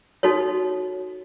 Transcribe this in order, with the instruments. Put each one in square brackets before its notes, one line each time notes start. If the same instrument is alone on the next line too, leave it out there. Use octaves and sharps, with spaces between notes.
[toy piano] D#4 F#4 A4 C#5